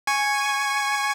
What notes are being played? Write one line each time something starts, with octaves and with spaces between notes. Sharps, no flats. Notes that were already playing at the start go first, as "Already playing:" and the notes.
G#5 C#6